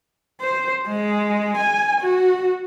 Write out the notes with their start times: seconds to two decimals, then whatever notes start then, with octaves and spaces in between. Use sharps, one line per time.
0.41 C5
0.87 G#3
1.57 G#5
2.01 F#4